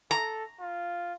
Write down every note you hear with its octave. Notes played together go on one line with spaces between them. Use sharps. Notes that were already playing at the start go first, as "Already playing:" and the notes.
A4 A#5
F4